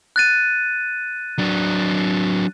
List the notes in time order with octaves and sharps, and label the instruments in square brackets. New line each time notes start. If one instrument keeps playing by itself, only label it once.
[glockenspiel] F#6 A6 D#7
[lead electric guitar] F#3 D4